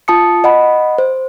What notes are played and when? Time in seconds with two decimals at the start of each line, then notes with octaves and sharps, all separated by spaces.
0.08 F4 A5 D#6 C#7
0.44 D#5 F#5 B5
0.98 C5